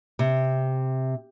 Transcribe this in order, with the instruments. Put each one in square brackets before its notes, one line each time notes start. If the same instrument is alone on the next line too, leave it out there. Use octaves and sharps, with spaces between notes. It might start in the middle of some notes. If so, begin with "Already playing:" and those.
[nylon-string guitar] C3